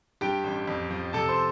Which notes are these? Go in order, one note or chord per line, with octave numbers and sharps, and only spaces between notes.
G2 G4 G5
A1
F2
F3
C3 A4 A5
C5 C6